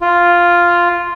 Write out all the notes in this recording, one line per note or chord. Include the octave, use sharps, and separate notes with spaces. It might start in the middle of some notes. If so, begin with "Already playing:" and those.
F4